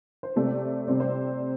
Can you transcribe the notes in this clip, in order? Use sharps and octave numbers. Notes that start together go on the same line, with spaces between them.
C5
C3 A3 C4 D5
C3 G3 C4 D5
C5